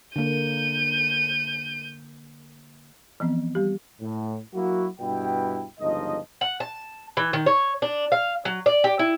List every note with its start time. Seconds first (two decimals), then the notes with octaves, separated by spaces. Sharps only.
0.16 D3 A#3 G6 D#7
3.20 E3 F3 B3 C4
3.55 G3 G4
4.01 A2
4.54 F#3 A#3 E4 F#4
5.00 G2 B2 E4 G5
5.80 G1 C#2 F3 D#4 D#5
6.41 F#5
6.60 A5
7.17 E3
7.33 D#3
7.46 C#5
7.82 D4
8.12 F5
8.45 F#3
8.66 D5
8.84 G4
8.99 E4